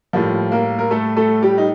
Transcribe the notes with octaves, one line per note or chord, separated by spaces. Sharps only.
A2 F3 G3 A#3 F4
A#3 A#4
A#4
A3 A4
A3 A4
G3 G4
D#4